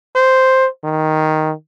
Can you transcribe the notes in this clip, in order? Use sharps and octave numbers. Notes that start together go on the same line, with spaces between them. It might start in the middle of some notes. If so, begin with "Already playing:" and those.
C5
D#3